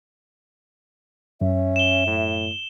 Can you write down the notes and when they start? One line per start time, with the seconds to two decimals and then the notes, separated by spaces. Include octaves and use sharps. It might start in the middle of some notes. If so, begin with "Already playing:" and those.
1.41 F#2 C#4 E5
1.76 E7 G7
2.07 A2